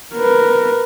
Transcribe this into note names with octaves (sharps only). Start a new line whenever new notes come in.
A#4 B4